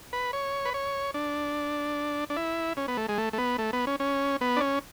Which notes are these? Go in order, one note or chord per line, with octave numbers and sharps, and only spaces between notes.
B4
C#5
B4
C#5
D4
D4
E4
C#4
B3
A3
G#3
A3
A3
B3
A3
B3
C#4
C#4
B3
D4
C#4